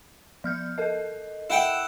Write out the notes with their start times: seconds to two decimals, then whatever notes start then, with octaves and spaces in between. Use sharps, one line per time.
0.44 F3 F6 G6
0.78 A4 A#4 D#5
1.50 E4 F#5 G5